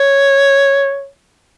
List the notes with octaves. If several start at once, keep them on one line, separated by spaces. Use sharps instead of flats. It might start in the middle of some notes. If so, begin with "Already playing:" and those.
Already playing: C#5